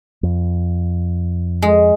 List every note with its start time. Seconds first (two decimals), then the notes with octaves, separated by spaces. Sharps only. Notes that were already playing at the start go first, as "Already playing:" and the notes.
0.23 F2
1.62 G#3